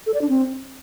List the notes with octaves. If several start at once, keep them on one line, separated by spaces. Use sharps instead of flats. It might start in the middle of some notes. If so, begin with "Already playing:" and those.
A4
D5
D4
C4